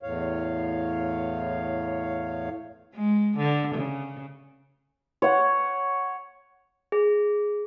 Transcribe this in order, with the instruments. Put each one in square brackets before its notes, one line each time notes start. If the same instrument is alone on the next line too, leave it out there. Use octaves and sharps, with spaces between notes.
[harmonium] E2 A2 C#5 F5
[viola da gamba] G#3
D3
C#3
[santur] C#5 F#5
[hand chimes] G#4